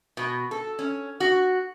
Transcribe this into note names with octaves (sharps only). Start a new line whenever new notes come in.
B2
A4
C#4
F#4